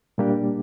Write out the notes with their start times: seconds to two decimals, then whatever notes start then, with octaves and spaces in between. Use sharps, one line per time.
0.18 A#2 G3 A#3 D4 G4